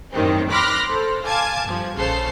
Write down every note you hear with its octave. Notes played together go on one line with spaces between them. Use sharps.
F#2 A2 D#3 G3 C4
B5 C6 D6 F6 F#6 A#6
A4 C5
F5 G#5 A5 D6 G#6
G2 F3
A#1 C#3 A4 C5 F5 C7